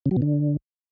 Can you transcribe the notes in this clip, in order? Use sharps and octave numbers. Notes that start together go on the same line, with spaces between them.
C#3
F#3
B2
D3